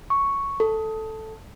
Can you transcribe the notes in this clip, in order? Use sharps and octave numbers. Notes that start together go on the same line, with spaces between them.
C#6
A4